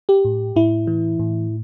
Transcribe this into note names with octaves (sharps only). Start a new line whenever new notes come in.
G4
A2
A2 E4
E3
A2